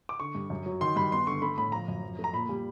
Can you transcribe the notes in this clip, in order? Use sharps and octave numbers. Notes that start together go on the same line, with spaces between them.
D6
D3 C#6
G2
F#2
F#3
D#3 C6
G2 B5
B3 C6
D3 C#6
A3 B5
A2 B5
F3 A#5
F#2
F3
A3
A#5
A#2 B5
G3